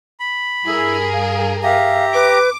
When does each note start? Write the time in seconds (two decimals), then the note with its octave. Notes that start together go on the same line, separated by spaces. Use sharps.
0.20 B5
0.65 G2 E4 G#4 A#4
1.12 F5
1.63 G4 E5 F5 A#5
2.14 B4 D6